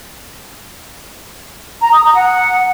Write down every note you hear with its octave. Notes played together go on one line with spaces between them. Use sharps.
A#5
D#6
A#5
F#5